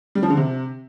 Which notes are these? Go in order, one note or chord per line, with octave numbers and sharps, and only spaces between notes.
G3
F3
D3
C3